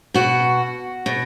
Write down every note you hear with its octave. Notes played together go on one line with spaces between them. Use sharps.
B2 F#4
B2